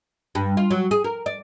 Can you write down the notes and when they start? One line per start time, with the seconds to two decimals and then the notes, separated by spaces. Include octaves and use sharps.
0.35 G2
0.57 F4
0.71 F#3
0.91 G#4
1.04 A#4
1.26 D5